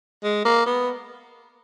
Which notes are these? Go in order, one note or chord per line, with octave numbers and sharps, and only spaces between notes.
G#3
A#3
B3